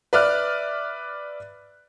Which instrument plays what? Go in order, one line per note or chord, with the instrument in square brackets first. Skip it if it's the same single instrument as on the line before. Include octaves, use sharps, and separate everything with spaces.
[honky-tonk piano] B4 D5 E5 F6 F#6